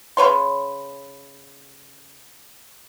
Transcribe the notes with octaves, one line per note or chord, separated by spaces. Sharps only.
C#3 B4 C#5 C6